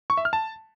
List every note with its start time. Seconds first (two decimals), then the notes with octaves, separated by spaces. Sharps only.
0.10 C#6
0.17 E5
0.25 F6
0.33 A5